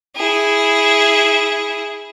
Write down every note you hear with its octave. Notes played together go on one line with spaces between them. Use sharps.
E4 G#4